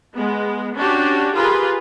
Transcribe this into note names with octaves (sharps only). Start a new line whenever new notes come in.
G#3 B3
C#4 D4 F#4 G4
F4 G4 G#4 A#4 B4